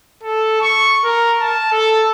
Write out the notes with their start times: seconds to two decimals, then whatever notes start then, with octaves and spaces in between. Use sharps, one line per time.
0.23 A4
0.61 C#6
1.04 A#4
1.40 A5
1.72 A4